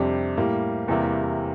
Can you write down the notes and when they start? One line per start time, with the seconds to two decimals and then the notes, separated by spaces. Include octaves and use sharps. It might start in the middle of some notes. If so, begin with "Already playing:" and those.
Already playing: F2 C3 G3 D4 G4
0.37 A2 G3 A#3
0.88 E2 C3 G3 A#3 E4